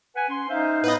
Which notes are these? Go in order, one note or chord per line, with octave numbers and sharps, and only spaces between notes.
B4 F#5 G#5
C#4 C6
D#4 C5 E5 F5
A2 B3 B4 D#5